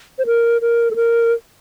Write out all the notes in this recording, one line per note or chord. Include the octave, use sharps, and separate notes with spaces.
C5
A#4
A#4
A4
A#4